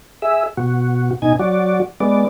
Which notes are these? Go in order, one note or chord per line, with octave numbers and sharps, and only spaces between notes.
G#4 E5
B2 F#4
B2 D#4 G#5
F#3 F#4 D5
G#3 B3 D5